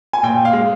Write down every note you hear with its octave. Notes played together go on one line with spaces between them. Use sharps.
G#5
A#2 G5
F5
G#3